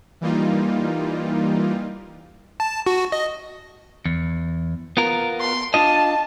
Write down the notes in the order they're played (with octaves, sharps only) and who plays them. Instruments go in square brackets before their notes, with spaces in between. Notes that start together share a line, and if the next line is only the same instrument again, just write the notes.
[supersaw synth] E3 G3 A#3 D#4 F4
[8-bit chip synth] A5
F#4
D#5
[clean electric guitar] E2
B3 F4 A#4
[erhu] C6
[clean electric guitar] D4 F4 D#5 [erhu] A5